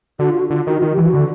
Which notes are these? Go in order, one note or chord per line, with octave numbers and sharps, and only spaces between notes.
D3 F#4
F4
F#4
D3 F4
D#3 F#4
F#4
D#3 F4
G4
E3
F#4
D3